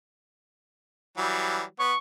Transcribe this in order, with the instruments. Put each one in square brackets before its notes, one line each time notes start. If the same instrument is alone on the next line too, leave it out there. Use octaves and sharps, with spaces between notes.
[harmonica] E3 F#3 G3
[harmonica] B3 [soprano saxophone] C#6